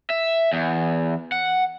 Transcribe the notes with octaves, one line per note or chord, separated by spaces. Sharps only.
E5
E2
F#5